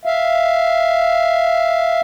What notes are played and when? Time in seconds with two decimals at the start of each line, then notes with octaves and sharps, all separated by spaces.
0.05 E5 F5